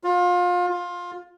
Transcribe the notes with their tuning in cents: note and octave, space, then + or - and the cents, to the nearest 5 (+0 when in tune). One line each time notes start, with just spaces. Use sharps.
F4 +30
F4 +20